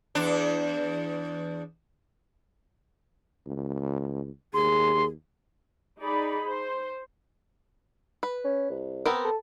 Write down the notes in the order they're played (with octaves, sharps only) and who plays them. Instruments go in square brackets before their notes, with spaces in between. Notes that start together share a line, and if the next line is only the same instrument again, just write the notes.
[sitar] E2 D4
[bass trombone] C#2
[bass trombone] D#2 [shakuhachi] G#4 [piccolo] C6
[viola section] D#4 G#4 D5 B5
C5
[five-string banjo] B4
[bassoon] C#4
C2
[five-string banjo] B3 C4 A#4
[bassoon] A4